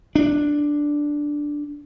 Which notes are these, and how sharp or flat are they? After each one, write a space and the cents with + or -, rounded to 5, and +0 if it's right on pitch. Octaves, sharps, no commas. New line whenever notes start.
D4 +0